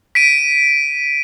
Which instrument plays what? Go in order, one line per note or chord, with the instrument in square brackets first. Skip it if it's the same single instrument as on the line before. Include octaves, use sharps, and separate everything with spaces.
[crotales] B6 D7 D#7